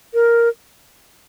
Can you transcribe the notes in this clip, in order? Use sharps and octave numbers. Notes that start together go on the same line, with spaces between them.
A#4